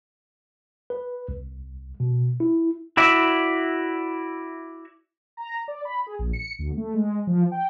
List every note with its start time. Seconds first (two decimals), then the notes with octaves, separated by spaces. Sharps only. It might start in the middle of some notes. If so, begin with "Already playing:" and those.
0.90 B4
1.29 C2
2.00 B2
2.40 E4
2.97 E4 F#4 D5 E5
5.37 A#5
5.68 D5
5.85 B5
6.06 G#4
6.19 A#1
6.33 C#7
6.59 D2
6.77 A3
6.94 G#3
7.27 F3
7.52 G5